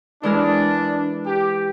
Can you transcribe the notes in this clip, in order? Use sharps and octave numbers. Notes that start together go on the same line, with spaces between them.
E3 G#3 D4 A#4
G4